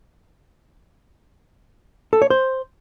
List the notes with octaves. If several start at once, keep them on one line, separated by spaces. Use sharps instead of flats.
A4
C#5
C5